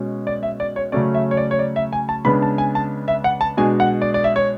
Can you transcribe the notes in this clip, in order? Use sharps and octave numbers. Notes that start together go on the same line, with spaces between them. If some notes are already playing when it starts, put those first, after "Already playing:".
Already playing: B2 G#3 C#4
D5
E5
D5
C#5
C#3 F#3 A3 C#4 D5
E5
C#5
D5
C#5
D5
E5
G#5
A5
C#3 G#3 B3 D4 B5
A5
G#5
A5
E5
F#5
A5
B2 G#3 D4 G#5
F#5
D5
D5
E5
C#5